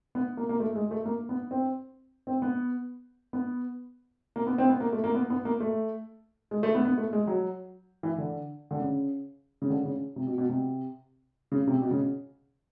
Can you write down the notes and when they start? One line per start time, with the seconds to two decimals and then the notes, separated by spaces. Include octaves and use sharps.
0.15 B3
0.37 A#3
0.49 A#3
0.60 A3
0.75 G#3
0.91 A3
1.05 A#3
1.29 B3
1.51 C4
2.27 C4
2.42 B3
3.33 B3
4.36 A#3
4.47 B3
4.58 C4
4.70 B3
4.80 A#3
4.93 A3
5.04 A#3
5.15 B3
5.30 B3
5.45 A#3
5.60 A3
6.51 G#3
6.63 A3
6.75 B3
6.85 B3
6.98 A3
7.13 G#3
7.27 F#3
8.03 E3
8.18 D3
8.71 D3
8.80 C#3
9.62 C#3
9.70 D3
9.85 C#3
10.16 C3
10.27 B2
10.38 B2
10.49 C3
11.52 C#3
11.67 C3
11.82 B2
11.91 C#3